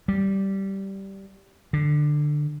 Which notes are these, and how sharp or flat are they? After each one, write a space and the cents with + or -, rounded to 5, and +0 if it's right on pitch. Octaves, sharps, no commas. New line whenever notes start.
G3 -10
D3 +15